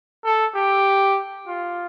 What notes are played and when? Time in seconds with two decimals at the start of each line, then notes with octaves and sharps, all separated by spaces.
0.25 A4
0.55 G4
1.47 F4